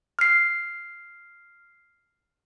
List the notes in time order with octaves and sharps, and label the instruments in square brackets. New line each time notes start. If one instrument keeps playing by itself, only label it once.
[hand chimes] F6 C7